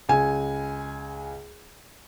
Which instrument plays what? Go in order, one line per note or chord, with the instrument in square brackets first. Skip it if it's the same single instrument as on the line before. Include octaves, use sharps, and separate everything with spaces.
[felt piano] C#2 G#5